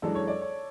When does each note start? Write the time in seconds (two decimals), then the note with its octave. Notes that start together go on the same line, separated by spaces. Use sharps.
0.02 F#2 E3 G#3 D4 A4
0.15 C#5
0.28 D5
0.41 C#5